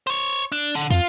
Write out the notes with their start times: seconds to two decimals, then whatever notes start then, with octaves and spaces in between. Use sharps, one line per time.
0.07 C5 C#5
0.52 D4
0.75 D3
0.90 F2 F4